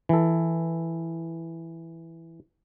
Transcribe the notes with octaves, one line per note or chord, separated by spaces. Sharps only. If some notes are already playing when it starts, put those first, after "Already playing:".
E3 A4